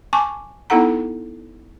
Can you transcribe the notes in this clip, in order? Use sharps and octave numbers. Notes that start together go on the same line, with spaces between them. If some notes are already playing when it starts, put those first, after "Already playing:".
G#5 A5 C#6 D6
B3 D#4 E4 A4 F#5 A#5